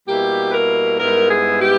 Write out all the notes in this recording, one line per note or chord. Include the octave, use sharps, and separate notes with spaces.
B2 G3 A#3 E4 G4
B4
A#4
G#2 G3 B3 E4 A#4
G#4
G4